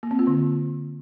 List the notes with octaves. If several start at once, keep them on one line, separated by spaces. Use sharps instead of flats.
A#3
C4
F4
D3